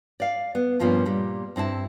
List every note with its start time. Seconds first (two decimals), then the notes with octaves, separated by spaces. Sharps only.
0.20 D5 F5
0.55 B3
0.80 G2 A#2 F3 A#3 B3 C#4
1.06 A#2 G3
1.56 G2 C4 E4 A5